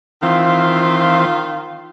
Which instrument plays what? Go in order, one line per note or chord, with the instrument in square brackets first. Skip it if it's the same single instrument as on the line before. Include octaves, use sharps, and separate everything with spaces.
[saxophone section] D#3 F4 [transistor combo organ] E3 C4